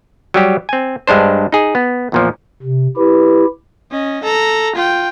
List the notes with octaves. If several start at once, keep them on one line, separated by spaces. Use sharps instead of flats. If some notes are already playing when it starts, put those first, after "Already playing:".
F#3 G3 G4
C4 G#5
G2 G#3 D4 C5
D#4 G#4
B3
E2 A#2 F3
C3
E4 G4 B4
C#4 D#5
A4 A#5
F4 G5